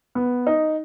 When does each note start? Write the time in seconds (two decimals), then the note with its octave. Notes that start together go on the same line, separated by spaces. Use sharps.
0.15 B3
0.47 D#4